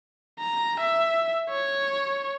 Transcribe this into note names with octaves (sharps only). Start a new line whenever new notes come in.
A#5
E5
C#5